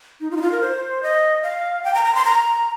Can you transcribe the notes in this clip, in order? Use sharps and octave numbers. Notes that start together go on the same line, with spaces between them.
D#4
F4
D#4
F4
A#4
C5
D#5
F5
G5
A#5
A#5
C6
A#5